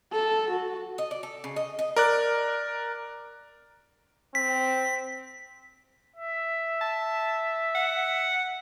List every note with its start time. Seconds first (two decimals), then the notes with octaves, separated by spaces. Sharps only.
0.12 A4
0.50 F#4
0.98 D#5
1.11 D5
1.23 A4
1.44 C#3
1.56 D#5
1.79 D#5
1.96 A#4 D5 F#6
4.35 C4 B6
6.16 E5
6.81 A5
7.75 F#5